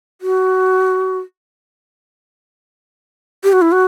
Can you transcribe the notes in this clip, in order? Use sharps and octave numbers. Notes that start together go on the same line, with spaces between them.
F#4
G4
F#4
E4
F#4